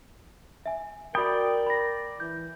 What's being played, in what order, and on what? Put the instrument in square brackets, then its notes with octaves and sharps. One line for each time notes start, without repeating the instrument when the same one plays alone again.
[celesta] E5 G#5
[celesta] F#4 B5 D#6 [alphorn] A#4 [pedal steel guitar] D5 G5
[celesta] B5 A#6
[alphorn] E3 [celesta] G6